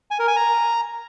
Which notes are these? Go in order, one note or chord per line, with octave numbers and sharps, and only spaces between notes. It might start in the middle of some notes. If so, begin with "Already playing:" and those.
G#5
A#4
G#5
A#5